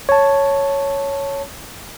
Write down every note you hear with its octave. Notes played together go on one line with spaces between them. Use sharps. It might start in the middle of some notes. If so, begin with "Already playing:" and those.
C#5 A5